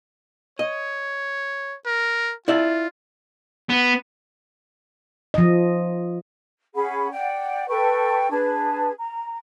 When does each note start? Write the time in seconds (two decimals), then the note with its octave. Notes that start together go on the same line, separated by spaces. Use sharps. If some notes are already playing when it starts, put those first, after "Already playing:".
0.59 C#5 D#5
1.86 A#4
2.48 E4 F4 D5 E5
3.70 B3
5.34 F3 D#5
6.75 C#4 G#4 F#5 B5
7.11 D5 F#5 G5
7.68 A4 B4 G5 C#6
8.30 D4 G#4 B4 A5
8.98 A#5